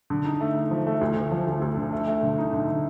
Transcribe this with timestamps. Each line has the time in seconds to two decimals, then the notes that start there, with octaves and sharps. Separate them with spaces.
0.10 D3
0.25 D#4
0.41 A3
0.56 D#4
0.71 F3
0.87 A3
1.01 D2
1.16 D2
1.32 F3
1.47 D2
1.62 D2
1.77 D3
1.93 A3
2.07 A3
2.23 D3
2.38 D#4
2.53 D3
2.68 D3